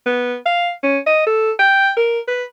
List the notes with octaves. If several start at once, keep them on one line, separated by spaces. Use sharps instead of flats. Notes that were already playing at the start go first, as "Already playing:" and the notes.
B3
F5
C#4
D#5
A4
G5
A#4
B4